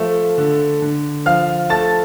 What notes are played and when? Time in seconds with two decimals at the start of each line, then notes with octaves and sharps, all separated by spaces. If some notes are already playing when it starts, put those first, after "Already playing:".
Already playing: F3 A3 E5
0.38 D3
0.82 D3
1.26 F3 F5 F6
1.70 A3 A5 A6